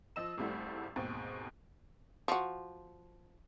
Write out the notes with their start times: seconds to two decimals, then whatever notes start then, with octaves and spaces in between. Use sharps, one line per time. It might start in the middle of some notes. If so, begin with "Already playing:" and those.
0.16 F3 D#5 E6 E7
0.38 G#1 C#2 G3 A3 E4 F#5
0.96 D#2 G#2 B2 C4
2.28 F3 F#4